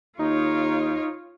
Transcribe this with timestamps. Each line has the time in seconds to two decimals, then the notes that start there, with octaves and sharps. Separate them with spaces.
0.19 D#2 D#4 F4 C#5